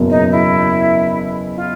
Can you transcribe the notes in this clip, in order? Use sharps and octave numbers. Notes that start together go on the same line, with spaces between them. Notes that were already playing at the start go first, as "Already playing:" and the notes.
Already playing: F#1 E2 B2 F#3 A#3
D#4
E4
F4